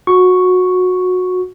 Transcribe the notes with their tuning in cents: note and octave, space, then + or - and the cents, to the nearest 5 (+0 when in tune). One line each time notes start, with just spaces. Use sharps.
F#4 -20 C#6 +0